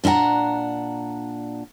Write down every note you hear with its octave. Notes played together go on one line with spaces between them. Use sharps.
A#2 D4 E4 F#5 A#5